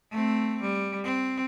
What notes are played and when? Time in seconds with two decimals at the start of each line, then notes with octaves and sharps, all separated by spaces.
0.11 A3 C4
0.62 G3
1.04 C4